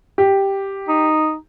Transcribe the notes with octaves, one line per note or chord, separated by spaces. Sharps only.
G4
D#4